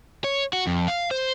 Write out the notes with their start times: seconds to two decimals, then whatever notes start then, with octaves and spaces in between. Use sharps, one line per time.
0.24 C#5
0.53 F#4
0.67 F2
0.88 F5
1.11 C5